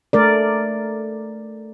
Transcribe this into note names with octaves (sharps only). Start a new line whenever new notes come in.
A3 A#4 D5